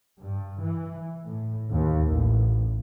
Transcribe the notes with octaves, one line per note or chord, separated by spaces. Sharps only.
G2
E3
A2
D#2
A1